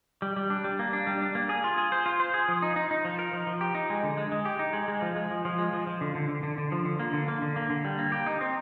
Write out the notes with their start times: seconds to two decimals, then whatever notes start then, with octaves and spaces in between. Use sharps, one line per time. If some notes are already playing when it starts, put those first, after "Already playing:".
0.22 G3
0.36 G3
0.50 D4
0.64 G3
0.79 A#3
0.93 D4
1.07 G3
1.22 D4
1.35 A#3
1.49 G#4
1.64 F4
1.78 G#4
1.92 C5
2.06 F4
2.20 C5
2.34 G#4
2.48 F3
2.62 D#4
2.76 D#4
2.91 D#4
3.05 F3
3.19 A#4
3.33 F3
3.47 F3
3.61 G4
3.75 D#4
3.90 G#3
4.03 D3
4.17 G#3
4.32 G#3
4.45 G4
4.59 D#4
4.73 G#3
4.88 G#3
5.02 F3
5.16 G#3
5.31 F3
5.45 F3
5.58 G#3
5.73 F3
5.87 F3
6.01 D3
6.15 D3
6.29 D3
6.43 D3
6.58 D3
6.72 F3
6.85 D3
7.00 A#3
7.13 D3
7.28 A#3
7.42 D3
7.56 A#3
7.70 D3
7.85 G3
7.99 A#3
8.12 G4
8.26 D#4
8.41 C4